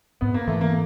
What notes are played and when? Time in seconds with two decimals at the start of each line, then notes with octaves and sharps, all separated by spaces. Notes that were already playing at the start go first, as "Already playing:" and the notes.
0.21 G#2 B3
0.34 A#3
0.47 E3 A3
0.61 A#3